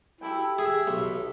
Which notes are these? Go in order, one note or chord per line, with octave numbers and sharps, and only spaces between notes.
E4 G4 A4 G5
G#4 E5
B1